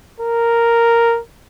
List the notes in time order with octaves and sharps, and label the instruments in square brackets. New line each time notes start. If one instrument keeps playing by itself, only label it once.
[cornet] A#4